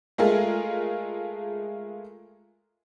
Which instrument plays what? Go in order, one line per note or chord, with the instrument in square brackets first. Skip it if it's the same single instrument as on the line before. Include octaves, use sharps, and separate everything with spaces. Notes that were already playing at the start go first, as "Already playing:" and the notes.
[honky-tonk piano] G#3 A3 F4 G#4 A#4